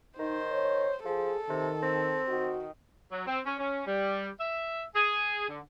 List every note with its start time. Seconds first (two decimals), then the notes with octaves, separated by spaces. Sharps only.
0.19 D#3 D#4 C5
0.52 C#5
1.05 F3 G#4 A4
1.49 C3 D#3
1.82 C4
2.28 D#3 F#4
3.11 F#3
3.27 C4
3.45 C#4
3.58 C#4
3.86 G3
4.39 E5
4.94 G#4
5.49 D3